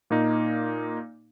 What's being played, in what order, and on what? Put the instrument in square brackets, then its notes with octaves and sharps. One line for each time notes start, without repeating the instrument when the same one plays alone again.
[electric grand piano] A#2 A#3 D#4